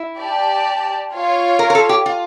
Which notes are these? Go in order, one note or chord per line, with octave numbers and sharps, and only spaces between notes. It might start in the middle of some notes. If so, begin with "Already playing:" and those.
Already playing: E4
G4 D5 A5
F4 C#5 F5
A#4
A#4
A4
G4
F4